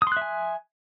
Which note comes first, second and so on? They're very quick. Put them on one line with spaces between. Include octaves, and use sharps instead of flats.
D#6 C6 F#6 E5 G#5